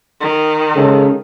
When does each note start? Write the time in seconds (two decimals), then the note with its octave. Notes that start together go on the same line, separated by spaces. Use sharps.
0.21 D#3
0.75 C#3 G#3 A4